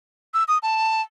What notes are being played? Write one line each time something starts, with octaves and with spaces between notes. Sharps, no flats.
E6
D#6
A5